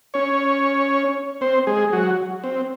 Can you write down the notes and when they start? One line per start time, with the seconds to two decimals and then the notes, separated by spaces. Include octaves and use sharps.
0.14 C#4 C#5
1.41 C4 C5
1.67 G#3 G#4
1.93 F#3 F#4
2.44 C4